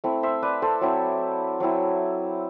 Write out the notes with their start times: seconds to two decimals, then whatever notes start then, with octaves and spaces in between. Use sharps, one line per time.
0.04 A3 C4 E4
0.23 C5 E5
0.42 B4 D5
0.62 A4 C5
0.81 F#3 C4 E4
1.60 F#3 C4 E4